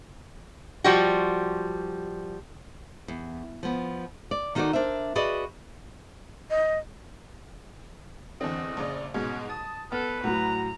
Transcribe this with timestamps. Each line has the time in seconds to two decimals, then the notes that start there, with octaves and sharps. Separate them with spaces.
0.84 F3 G3 F#4
3.08 E2
3.63 F3 B3
4.31 D5
4.55 D#3 D#4 E4 F#4 A4 D5
4.73 D4 A#4 C5 E5
5.15 F#4 G#4 B4 D5 D#5
6.50 D#5
8.41 E2 D3 C4 D#5
8.77 A#1 C#3 D5
9.14 G#2 B2 G#3 C#4
9.49 A5 D#6
9.92 B3 A4 B4 F6
10.24 A2 F#3 F#4 A#5